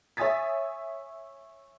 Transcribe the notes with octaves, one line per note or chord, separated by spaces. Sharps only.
C#5 E5 G#5 D#6 A6 B6